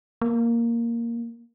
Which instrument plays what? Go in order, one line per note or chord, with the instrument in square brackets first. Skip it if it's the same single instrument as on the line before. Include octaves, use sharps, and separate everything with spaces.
[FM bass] A#3